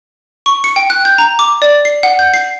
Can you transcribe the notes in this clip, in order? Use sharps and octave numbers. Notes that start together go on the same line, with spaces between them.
C#6
C#7
G5
F#6
G6
A#5
D6
D5
C7
F#5
G6
C7